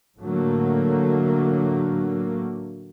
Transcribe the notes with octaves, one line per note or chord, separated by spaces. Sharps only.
A2 D3 F#3 A3 A#3